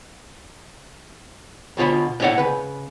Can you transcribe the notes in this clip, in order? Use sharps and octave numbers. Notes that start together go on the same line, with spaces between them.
D2 B2 F4 C#5 B5
A2 A#3 E4 C#5 D5 F#5
C#3 B4